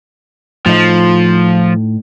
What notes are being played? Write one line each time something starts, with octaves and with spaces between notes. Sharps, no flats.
A2 F3 D#4